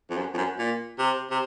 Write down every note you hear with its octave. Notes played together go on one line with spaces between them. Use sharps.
F2
F#2
F2
F#2
A#2
C3
C3